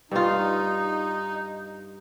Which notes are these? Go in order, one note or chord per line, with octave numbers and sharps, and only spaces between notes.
G2 D#4 F4